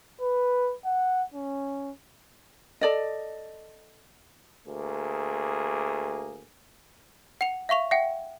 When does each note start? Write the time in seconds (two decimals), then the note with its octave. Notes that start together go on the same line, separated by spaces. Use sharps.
0.21 B4
0.85 F#5
1.34 C#4
2.81 A4 D5 D#5
4.67 D2 A#3 G#4
7.41 F#5 C#7 F7
7.69 E5 F5 C#6 F7
7.91 E5 F#5 G5